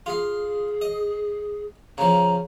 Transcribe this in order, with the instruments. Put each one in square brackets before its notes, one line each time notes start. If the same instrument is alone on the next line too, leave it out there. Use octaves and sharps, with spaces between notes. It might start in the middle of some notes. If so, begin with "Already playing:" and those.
[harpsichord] F4 F5 [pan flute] G#4
[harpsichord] D#5
[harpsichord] C#3 F3 [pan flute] A#5